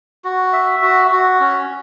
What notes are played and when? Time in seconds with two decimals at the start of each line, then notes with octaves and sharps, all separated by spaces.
0.25 F#4
0.53 E5
0.82 F#4
1.11 F#4
1.40 C#4